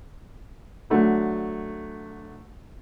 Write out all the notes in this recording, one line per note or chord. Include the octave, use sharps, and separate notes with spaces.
D3 F#3 A3